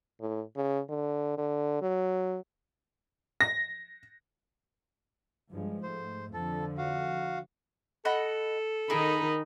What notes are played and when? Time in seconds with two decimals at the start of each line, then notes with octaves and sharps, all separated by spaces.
0.21 A2
0.56 C#3
0.89 D3
1.38 D3
1.82 F#3
3.41 A#6
5.51 G2 F3 G#3
5.83 G#2 A3 C5
6.34 F2 D3 F3 A4
6.78 F#4 F5
8.05 A4 D#5 F#5 B5
8.90 D#3 D#4 G#4 A#4 B5